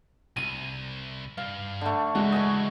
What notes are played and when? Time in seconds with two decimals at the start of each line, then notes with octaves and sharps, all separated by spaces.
0.37 C2 D#7
1.38 G2 F5
1.81 D3 A3
2.15 C#2 E3 G#3 F#4
2.32 D#5 G#5 C#6